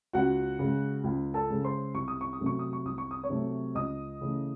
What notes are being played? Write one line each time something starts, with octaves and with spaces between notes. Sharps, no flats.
C#2 F#4 F#5
C#3 G#3
C#2
A4 A5
C#3 G#3
C5 C6
C2 C#6
D#6
C#6
D#6
C3 F#3 A3
C#6
D#6
C#6
C2 D#6
C#6
D#6
C#5 C#6
C3 F#3 A3
C#2 D#5 D#6
C#3 E3 A3